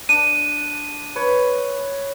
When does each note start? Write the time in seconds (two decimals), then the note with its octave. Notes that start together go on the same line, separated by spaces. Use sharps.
0.09 D4 D#7
1.16 B4 C#5